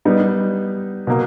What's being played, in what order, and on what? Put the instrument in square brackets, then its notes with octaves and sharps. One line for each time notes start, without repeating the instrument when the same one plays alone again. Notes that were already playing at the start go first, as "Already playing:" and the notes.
[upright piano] G3 B3 D#4
B2 A#3